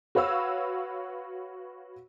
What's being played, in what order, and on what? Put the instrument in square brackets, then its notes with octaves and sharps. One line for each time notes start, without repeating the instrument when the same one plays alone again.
[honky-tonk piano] F#4 B4 C#5 F5 E6